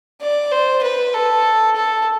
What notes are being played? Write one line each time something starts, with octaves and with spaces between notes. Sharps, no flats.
D5
C5
B4
A4
A4